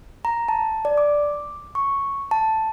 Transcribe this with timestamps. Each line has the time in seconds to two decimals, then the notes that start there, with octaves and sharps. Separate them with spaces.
0.25 A#5
0.48 A5
0.85 D5
0.98 D6
1.75 C#6
2.31 A5